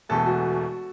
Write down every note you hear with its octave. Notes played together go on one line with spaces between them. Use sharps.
E1 E2 B2 A3 A4
F#4